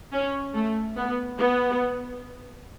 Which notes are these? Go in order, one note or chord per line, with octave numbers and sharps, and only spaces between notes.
C#4
A3
B3
B3